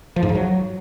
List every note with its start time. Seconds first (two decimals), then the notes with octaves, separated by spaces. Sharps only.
0.16 F3
0.23 G#2
0.29 F3
0.35 F#3